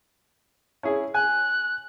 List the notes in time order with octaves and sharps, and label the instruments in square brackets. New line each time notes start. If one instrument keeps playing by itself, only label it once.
[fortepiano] C#4 E4 G#4
[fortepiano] G#5 [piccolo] F#6